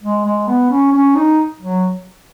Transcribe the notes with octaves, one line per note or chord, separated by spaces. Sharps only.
G#3
G#3
B3
C#4
C#4
D#4
F#3